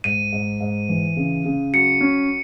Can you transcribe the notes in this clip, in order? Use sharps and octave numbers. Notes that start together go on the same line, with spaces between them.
G#2 D#7
G#2
G#2
E3
C#3
C#3
F#3 C#7
C#4